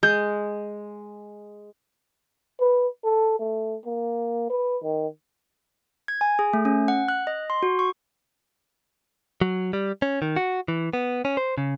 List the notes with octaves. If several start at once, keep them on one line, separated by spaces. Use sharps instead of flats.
G#3 G6
B4
A4
A3
A#3
B4
D#3
G#6
G#5
G#4
A3
C#4
F#5
F#6
D#5
C6
F#4
C#6
F#3
G3
C#4
D#3
F#4
E3
B3
C#4
C5
C#3